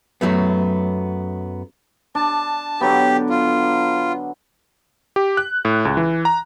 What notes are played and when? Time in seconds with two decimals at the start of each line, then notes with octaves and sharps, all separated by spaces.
0.21 F#2 F#3 A3 B3
2.15 D4 A5
2.81 D3 F#3 B3 G4
3.30 F4
5.16 G4
5.37 F#6
5.65 A2
5.85 C#2
5.97 E3
6.25 A#5